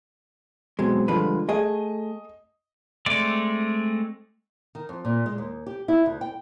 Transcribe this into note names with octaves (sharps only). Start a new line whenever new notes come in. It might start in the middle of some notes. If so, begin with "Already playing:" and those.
B2 F#3 G#3 C4
D3 F3 G3 G#3 B4
A3 G#4 D#5
G#3 A3 C4 D5
D#3
F2
A#2
G#3
D#2
G4
E4
D2
G5